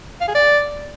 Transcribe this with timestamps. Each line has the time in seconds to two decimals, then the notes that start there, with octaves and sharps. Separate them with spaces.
0.21 F5
0.28 G#4
0.35 D5